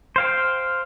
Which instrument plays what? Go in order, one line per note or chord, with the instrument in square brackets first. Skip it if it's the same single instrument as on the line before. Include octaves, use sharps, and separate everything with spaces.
[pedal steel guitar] C5 F5 G5